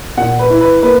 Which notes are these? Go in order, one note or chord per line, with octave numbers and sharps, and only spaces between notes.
A#2 F#5
B4
E4
B4
A#3 B4